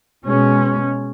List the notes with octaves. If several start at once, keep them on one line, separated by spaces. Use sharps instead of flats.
B2 G#3 C#4